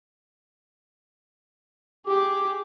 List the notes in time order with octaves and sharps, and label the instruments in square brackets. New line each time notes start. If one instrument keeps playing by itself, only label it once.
[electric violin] G4 G#4 [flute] D6